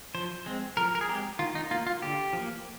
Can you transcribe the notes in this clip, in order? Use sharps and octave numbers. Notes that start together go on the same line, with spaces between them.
F3 C5
G#3 C4
F3 A#4
A#4
G#4
G#3 C4 G4
D#3 F4
D#4
A#3 F4
F4
D3 G4
F3
A#3